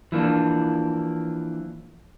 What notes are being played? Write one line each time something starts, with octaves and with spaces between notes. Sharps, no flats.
E3 F3 A#3 D4